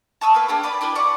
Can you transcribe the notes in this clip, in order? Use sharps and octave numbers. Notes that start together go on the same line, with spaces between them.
A5 C#6 D#6 E6
A#3 B3 B4
A#3 D4 G4 G#4
B4 D5 B5
D4 E4 G4 B4
D5 F#5 C#6 D6